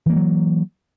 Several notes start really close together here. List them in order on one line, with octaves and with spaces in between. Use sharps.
E3 A#3 G3 F#3